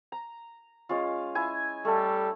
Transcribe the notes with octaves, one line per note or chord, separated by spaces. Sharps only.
A#5
G#3 C#4 F4
E4 G#5
G3 A3 A4